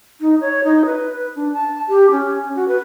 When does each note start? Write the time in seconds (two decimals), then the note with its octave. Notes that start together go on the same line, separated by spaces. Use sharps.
0.21 D#4
0.41 C#5
0.64 D#4
0.86 B4
1.36 D4
1.53 A5
1.89 G4
2.12 C#4
2.56 F#4
2.68 B4